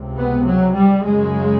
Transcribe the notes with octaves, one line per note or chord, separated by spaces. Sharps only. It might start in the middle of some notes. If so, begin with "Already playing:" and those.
Already playing: C#2 C3
B3
F#3
G3
F#2 C#3 G#3